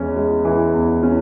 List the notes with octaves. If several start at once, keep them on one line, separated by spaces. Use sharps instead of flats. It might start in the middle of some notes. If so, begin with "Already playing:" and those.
Already playing: E2 E3 G#3 C#4
G#3
E3
E2
C#4